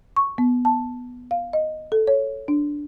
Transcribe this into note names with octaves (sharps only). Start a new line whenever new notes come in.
C#6
B3
A5
F5
D#5
A4
C#5
D4